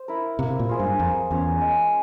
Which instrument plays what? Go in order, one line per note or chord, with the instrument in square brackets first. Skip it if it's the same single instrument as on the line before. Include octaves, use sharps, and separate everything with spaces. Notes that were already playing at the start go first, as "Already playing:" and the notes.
Already playing: [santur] C5
E4 A#4
[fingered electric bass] C3 [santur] A#3
[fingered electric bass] A#2
[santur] F4 G#4 C5
[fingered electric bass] G2
[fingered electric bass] F2 [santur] A#3
[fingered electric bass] E2 [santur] C#4 F4
[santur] G#3